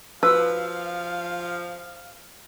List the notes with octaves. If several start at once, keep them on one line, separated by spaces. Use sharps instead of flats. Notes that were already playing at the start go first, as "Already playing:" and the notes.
F3 F#4 B4 F5 E6